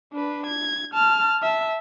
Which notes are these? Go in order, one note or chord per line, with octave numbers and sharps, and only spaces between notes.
D4 B4
G#6
A5 F6
E5 A5